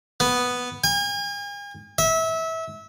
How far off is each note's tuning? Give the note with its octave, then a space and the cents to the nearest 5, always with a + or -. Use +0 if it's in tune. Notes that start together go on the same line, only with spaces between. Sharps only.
B3 +0
G#5 -40
E5 -25